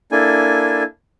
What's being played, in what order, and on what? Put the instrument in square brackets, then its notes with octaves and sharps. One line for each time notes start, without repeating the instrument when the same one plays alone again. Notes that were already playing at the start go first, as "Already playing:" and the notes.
[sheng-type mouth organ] A#3 D4 E4 A4 G#5